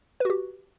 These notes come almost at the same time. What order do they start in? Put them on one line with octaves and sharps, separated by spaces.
B4 F#4 G4